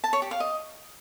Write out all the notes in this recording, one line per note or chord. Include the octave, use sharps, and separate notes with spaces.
A5
C#5
G4
F5
D#5